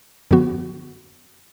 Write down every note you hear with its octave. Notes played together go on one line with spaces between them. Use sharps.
F#2 D3 F3 B3 F#4